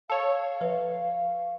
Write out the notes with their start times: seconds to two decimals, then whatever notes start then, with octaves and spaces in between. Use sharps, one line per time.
0.10 A4 C#5 F5
0.61 F3 B4